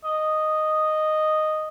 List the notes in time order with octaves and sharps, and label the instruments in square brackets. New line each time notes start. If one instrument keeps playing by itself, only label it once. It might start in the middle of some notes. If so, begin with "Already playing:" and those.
[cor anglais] D#5